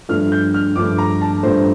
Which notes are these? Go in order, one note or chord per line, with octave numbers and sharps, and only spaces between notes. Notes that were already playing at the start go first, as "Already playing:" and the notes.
G2 F3 A3 F6
G6
F6
G2 F3 A3 D6
A#5
A5
G2 F3 A3 C5